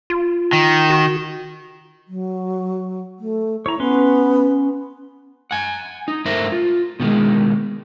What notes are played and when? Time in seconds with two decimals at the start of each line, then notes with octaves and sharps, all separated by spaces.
0.10 F4
0.53 D#3
0.90 F#4
2.08 F#3
3.20 A3
3.66 E4 C#5 A#5
3.80 B3 C#4 B4 C6
5.51 F#5 G#5
6.08 D#4
6.25 G2 A3 A#4 C5 E5 A#5
6.52 F4
7.00 B2 D#3 G3 G#3